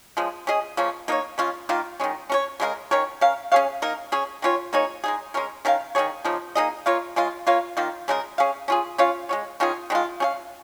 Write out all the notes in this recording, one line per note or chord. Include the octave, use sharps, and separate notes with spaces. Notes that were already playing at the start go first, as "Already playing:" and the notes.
C#3 F3 G#3
C#4 G#4 D#5
C#3 F3 A#3 C#4
A#3 D#4 A#4 C#5
C#3 G#3 C#4 F4
D#3 A#3 F4
D#3 G#3 C#4
C#4 A#4 C#5
C#3 G#3 F4 A#4
D#3 C#4 A#4 C#5
C#4 A#4 F5
C#4 G#4 C#5 F5
A#3 D#4 A#4
C#4 G#4 C#5
D#3 C#4 F4 C#5
A#3 D#4 G#4 C#5
G#3 D#4 G#4
G#3 C#4 A#4
D#3 C#4 A#4 F5
D#3 C#4 G#4 C#5
C#3 F3 A#3 D#4
A#3 D#4 G#4 D#5
A#3 F4 C#5 F5
C#3 G#3 F4
A#3 F4 C#5 F5
D#3 A#3 F4
C#3 G#3 D#4 A#4
C#4 G#4 F5
C#4 F4 G#4
C#4 F4 C#5 F5
G#3 F4 C#5
D#3 C#4 F4 G#4
D#3 G#3 F4
C#4 G#4 F5